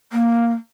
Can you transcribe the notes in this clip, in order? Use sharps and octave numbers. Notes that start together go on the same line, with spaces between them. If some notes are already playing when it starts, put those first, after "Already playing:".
A#3